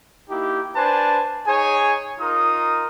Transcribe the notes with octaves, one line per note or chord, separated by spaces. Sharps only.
A#3 D#4 E4 G4
D4 B4 C5 G#5 A5
D#4 G#4 C#5 G#5
D#4 F4 A#4 D#6